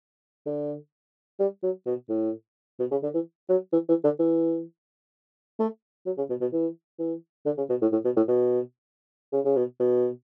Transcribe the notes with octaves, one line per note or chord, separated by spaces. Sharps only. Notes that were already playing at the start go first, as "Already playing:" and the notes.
D3
G3
F#3
B2
A2
B2
C#3
D3
E3
F#3
E3
E3
D3
E3
A3
F#3
C#3
B2
B2
E3
E3
D3
C#3
B2
A2
A2
B2
A2
B2
C#3
C#3
B2
B2